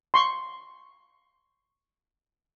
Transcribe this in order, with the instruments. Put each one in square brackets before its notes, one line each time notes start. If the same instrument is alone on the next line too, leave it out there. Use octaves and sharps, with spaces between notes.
[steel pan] C6 C#6